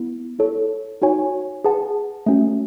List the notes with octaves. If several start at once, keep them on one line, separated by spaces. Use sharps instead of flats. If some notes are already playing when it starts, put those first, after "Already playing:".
Already playing: B3 E4
E4 A4 C#5
D#4 F#4 C#5 G#5
G#4 B4 F#5 A5
A3 C#4 F#4